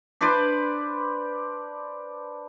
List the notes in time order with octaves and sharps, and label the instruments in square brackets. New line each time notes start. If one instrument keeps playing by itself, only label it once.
[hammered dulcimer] D4 B4 C5 D5